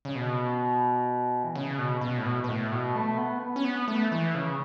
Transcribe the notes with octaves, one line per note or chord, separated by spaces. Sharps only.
C#3
B2
E3
C#3
B2
B2
A2
B2
B2
A2
B2
A3
B3
C#4
B3
A3
E3
C#3